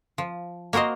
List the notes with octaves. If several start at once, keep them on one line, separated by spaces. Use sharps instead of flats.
F3
A#3 F#4 A#4 C5 D#5